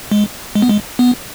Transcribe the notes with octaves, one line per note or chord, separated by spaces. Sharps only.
G#3
G#3
B3
G#3
B3